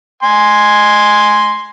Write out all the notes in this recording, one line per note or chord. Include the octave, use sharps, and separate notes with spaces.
G#5 C6